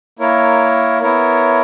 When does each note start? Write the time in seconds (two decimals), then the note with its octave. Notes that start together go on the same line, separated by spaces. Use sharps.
0.19 A#3 E4 A#4 C#5
1.02 B3 E4 A#4 C#5